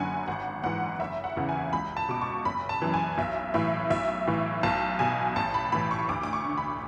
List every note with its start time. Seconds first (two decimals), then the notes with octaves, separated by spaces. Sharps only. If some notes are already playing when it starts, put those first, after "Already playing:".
Already playing: F#1 F#2 D3 F#5 G#5
0.28 G#1 F#5
0.64 G#2 E3 F#5
1.00 F#1 E5
1.24 F#5
1.37 E2 C#3 E3
1.49 G#5
1.73 C#2 B5
1.97 A5
2.09 B2 D6
2.21 C#6
2.45 F#1 B5
2.69 A5
2.82 F#2 E3
2.94 G#5
3.18 B1 E5
3.54 A2 E3 E5
3.90 B1 E5
4.27 A2 E3
4.63 B1 A5
4.99 B2 G#5
5.36 A1 A5
5.54 B5
5.72 A2 E3 B5
5.91 C#6
6.09 D2 D6
6.23 D6
6.33 C#6
6.46 D3
6.58 B5